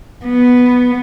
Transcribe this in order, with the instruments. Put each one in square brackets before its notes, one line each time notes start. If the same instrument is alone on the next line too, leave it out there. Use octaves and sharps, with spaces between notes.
[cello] B3